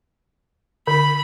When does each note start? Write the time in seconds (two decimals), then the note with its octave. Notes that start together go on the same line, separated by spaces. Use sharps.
0.87 D3 B5